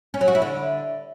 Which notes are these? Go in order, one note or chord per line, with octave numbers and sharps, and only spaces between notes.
C#4
F#3
F#4
E4
D3